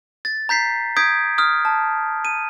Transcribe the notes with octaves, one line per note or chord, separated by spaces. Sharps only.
A6
A#5 G6 B6 C7
D#6 G6 G#6 B6 D7
D#6 F6
A5
D#7